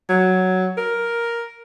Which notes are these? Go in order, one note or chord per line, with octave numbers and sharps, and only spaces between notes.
F#3
A#4